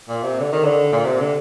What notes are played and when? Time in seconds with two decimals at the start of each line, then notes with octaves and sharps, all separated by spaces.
0.08 A#2
0.23 C3
0.39 D3
0.52 D#3
0.65 D3
0.92 A#2
1.05 C3
1.19 D3